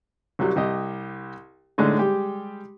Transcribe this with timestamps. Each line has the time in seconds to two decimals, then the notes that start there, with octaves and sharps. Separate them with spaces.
0.39 C2 F#3 G3
0.56 C2 G4 D#5
1.78 A2 D3 G#3 D#4
1.99 G3 G#3 G4